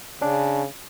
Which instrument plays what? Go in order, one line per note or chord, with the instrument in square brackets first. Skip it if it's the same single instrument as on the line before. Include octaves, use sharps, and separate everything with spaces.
[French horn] C#3 [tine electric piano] C#4 D4